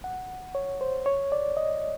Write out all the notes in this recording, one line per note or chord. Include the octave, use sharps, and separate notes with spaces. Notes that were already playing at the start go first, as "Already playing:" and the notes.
F#5
C#5
C5
C#5
D5
D#5